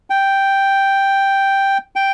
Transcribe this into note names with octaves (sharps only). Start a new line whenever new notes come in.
G5
G5